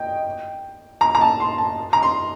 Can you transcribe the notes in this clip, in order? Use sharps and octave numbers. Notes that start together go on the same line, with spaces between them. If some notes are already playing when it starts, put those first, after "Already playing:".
Already playing: D#5 G5
A#5
A#5
A5
C6
A5
A#5
C6